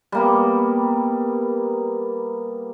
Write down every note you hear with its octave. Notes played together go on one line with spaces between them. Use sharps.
G3 A#3 B3